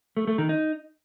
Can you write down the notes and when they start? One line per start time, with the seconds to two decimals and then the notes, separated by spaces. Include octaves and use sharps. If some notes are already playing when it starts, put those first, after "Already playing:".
0.17 A3
0.27 A3
0.38 D#3
0.49 D#4